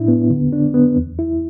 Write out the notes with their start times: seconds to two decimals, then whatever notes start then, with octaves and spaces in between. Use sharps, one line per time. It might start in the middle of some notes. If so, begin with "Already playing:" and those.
Already playing: A2 D4 E4
0.08 B3
0.30 D3
0.53 D4
0.74 B3
0.97 E2
1.19 E4